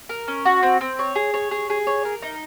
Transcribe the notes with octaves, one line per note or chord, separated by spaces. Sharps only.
A#4
C#4
F#4
C4
C4
C#5
G#4
C#5
G#4
G#4
C#5
A#4
D#4